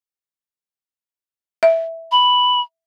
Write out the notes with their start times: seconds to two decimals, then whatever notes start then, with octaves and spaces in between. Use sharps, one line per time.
1.63 E5
2.11 B5